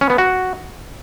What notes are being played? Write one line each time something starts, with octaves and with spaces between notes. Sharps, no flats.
C#4
B3
F#4